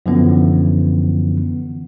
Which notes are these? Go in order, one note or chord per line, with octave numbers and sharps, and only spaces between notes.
F#2 D3 E3 F3 B3 C#4